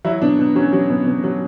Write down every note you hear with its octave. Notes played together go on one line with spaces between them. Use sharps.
F#3 E4
B2 D4
B2
F#3 C#4
F#3
B2
B2
F#3